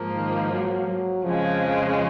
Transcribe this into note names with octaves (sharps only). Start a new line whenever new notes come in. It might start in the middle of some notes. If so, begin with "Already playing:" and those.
Already playing: G#2 F3 A#3
D#3
F#3
F#3
F2 C#3 F3 G#3